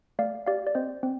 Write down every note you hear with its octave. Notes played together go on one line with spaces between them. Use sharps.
A3 D5 F5
G4 D5 F5
D5
C4 C5 D#5
C4